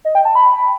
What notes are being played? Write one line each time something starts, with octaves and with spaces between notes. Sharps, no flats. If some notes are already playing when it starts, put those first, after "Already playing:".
D#5
G5
A5
B5